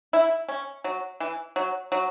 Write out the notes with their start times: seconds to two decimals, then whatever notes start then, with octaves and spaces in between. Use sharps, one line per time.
0.13 E4
0.48 C#4
0.84 F#3
1.20 E3
1.56 F#3
1.92 F#3